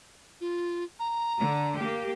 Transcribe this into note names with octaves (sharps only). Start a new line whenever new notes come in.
F4
A#5
D3
A#3 G4